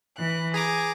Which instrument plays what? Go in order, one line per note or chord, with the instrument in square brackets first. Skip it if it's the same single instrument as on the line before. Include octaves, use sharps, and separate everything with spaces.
[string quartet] E3 F#6
[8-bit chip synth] G#4 A#5 D6 [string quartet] G#5